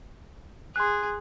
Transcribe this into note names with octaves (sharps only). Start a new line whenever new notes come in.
G#4 C6 F#6